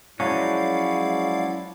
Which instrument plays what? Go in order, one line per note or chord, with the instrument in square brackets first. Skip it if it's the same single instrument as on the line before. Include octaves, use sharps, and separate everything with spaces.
[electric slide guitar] F3 F#3 C#4 [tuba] G#3 [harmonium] E4 D5 [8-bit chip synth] F5